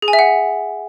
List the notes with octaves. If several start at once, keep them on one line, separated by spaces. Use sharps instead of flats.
G#4
G#5
E5
F#5